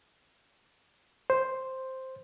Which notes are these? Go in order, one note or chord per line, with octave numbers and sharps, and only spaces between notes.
C5